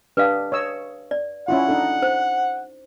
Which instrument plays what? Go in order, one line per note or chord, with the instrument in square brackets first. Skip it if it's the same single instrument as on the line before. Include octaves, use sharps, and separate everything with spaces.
[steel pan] D4 G4 D#5 [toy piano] B4 F5
[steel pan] C#5 D#5 E6
[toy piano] D5
[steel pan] C#4 E4 F4 [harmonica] F#5
[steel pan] D4 D#4 A4
[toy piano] C5